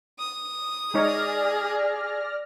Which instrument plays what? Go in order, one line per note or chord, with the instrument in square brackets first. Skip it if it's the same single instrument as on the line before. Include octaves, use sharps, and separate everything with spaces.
[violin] D#6
[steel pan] G#3 D#4 C#5 [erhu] G#4 [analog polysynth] D5 F6 A#6